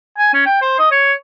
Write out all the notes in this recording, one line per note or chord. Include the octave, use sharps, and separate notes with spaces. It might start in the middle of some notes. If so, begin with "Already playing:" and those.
G#5
C#4
G5
C5
D#5
C#5